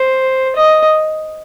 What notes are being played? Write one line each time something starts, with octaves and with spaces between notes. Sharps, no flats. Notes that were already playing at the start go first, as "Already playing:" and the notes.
Already playing: C5
D#5